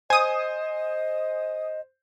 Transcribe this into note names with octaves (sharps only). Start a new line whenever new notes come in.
C5 D#5 G#5 D#6